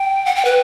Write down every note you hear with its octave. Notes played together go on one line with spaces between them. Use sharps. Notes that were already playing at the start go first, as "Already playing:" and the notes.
Already playing: G5
F#5
G5
B4